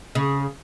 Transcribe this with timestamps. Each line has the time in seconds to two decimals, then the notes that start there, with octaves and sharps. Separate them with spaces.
0.15 C#3